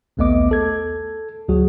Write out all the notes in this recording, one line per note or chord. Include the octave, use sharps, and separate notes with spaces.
A#1 D#2 A3 B3 D#5 D6
A4 G#6
D2 F#3 F#4 G#4